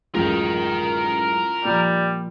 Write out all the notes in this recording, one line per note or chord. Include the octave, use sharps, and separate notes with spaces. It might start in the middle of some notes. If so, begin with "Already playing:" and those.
A1 F#2 G#3 F4 A#4 G5
A#2 F3 G3